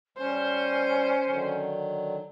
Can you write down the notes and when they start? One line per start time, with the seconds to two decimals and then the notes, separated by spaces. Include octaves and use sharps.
0.17 G3 C#4 C5
1.26 D3 D#3 F#3